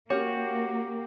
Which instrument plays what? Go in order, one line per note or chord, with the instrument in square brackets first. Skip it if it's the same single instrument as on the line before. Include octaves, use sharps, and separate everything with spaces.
[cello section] A#3 [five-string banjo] C#4 A#4 C#5 [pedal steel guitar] F#4 [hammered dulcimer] G4